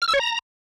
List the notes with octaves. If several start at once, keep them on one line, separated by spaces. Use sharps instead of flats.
F6
E6
C#5
A#5